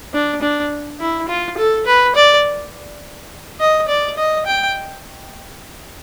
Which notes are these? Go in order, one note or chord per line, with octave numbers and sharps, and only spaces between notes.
D4
D4
E4
F4
A4
B4
D5
D#5
D5
D#5
G5